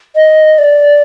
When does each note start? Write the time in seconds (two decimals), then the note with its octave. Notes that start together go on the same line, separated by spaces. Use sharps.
0.16 D#5
0.59 D5